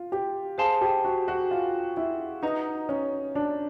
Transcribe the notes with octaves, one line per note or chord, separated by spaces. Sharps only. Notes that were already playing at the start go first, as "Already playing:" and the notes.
Already playing: F4
G4
G#4 C5 F5 A5 C6
G4
F#4
F#4
F4
E4
D#4 B4 D#5 F#5 A#5 D#6
C#4
D4